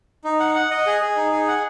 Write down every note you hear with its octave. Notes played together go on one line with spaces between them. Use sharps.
D#4
F#5
F#5
D#5
G#4
G#4
D#4
G#4
F#5